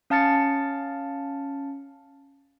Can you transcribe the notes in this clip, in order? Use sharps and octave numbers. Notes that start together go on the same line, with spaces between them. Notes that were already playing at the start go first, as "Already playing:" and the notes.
C#4 F5 A5 F6 A6 C#7